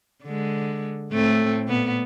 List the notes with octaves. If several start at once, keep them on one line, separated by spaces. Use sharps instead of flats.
D3 G#3
A2 A3 C4
A#2 B3